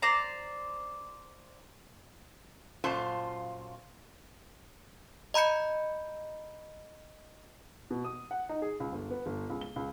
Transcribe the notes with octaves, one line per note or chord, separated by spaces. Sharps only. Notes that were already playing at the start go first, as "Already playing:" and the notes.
C5 D5 A#5
F#2 A#2 F4 C5 A5
D#5 A#5 B5 G6 C#7
B2
D#6
F#5
D#4
G#4
C#2
G1
B3
G1
C#2
G7
C#2